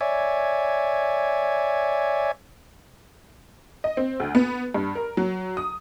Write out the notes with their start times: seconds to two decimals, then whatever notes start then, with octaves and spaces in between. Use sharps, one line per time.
0.01 C#5 D5 E5 G#5
3.84 D#5
3.97 C4
4.20 D2
4.35 B3
4.74 G2
4.95 A#4
5.17 F#3
5.57 D#6